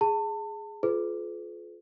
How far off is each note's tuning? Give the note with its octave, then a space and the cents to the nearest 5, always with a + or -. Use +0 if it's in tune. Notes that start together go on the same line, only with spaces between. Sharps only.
G#4 +0 A5 +30
F4 +0 G#4 +45 B4 +30